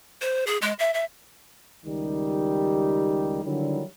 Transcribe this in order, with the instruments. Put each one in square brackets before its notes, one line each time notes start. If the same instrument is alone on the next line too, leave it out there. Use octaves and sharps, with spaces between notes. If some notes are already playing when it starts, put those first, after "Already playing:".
[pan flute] C5
G#4
G#3
E5
E5
[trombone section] C#2 D#3 G3 D#4 G4
D3 D#3 F#3 G3 E4